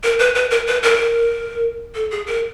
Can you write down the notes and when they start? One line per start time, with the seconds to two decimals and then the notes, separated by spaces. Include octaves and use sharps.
0.03 A#4
0.19 B4
0.35 B4
0.51 A#4
0.67 B4
0.83 A#4
1.95 A4
2.11 G#4
2.27 A#4